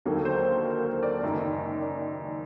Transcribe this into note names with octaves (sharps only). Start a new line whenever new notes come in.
D#2 D3 F#3 A#3 D#4 A4
C5
C5
A#4
C5
D5
F#1 F#2 D#3 D5
D5